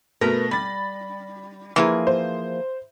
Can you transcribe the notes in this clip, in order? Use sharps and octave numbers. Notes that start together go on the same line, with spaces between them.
B2 A3 A#4 B4 A#6
G3 B5 A6
E3 F3 A#3 G#4
C5